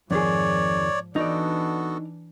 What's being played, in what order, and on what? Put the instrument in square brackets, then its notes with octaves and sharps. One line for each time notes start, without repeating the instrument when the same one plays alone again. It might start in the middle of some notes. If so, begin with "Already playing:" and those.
[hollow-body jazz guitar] F2 D#3 G#4 [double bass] G#2 F3 [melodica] C#5 D5
[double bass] E3 D4 [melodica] B3 F#4 A4 [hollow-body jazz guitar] D#4 D5